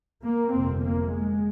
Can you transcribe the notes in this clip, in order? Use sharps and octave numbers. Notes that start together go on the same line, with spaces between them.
A#3
G1 F2 C3 C4
A#3
G#3